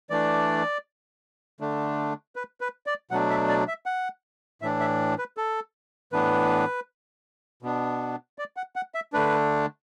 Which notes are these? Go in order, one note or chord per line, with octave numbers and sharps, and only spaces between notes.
E3 A3 D4 D5
D3 A3 D4
B4
B4
D5
B2 F#3 A3 D4 F#5
E5
D5
E5
F#5
A2 E3 D4 E5
E5
B4
A4
A2 E3 B3 D4 B4
B2 B3 D4
D5
F#5
F#5
E5
D3 A3 D4 B4